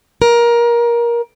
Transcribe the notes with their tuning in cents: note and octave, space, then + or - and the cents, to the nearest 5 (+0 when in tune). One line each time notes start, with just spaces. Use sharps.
A#4 +20